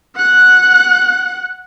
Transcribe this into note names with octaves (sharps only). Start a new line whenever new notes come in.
F#5 F#6